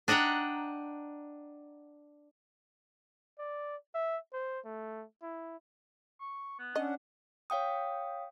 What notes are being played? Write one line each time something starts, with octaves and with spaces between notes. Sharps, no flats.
D4 D#5 F#5 G5 A#5
D5
E5
C5
A3
E4
C#6
B3
C#4 D4 D#5 F#5
C#5 F5 G5 D#6